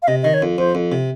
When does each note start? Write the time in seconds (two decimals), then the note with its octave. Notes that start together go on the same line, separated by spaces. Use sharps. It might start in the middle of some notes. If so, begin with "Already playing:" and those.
0.02 F5
0.08 C3 D#5
0.23 D#3 D#5
0.34 C#5
0.42 F2
0.58 F2 C5
0.75 F2
0.92 C3